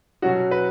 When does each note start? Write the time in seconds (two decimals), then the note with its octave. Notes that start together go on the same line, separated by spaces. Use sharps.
0.22 B2 F#3 C#4 F#4
0.51 B4